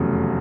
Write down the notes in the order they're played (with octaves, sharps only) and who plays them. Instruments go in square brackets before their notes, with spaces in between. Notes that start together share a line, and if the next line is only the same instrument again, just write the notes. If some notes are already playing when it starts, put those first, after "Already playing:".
Already playing: [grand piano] F1 E2 C#3 F#3 A3